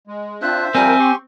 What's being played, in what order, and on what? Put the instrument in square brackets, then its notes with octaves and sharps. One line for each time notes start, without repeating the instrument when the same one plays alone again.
[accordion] G#3
[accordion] C4 D4 F4 [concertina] C5 E5 [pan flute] F#6
[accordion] F3 G3 A#4 [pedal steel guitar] C4 [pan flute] G#5
[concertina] G4 [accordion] C6 C#6